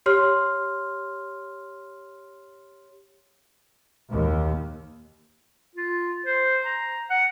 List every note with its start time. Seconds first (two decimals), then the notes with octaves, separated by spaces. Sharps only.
0.06 G4 C#5 C6 F6
4.10 D#2
5.76 F4
6.26 C5
6.64 A#5
7.10 F#5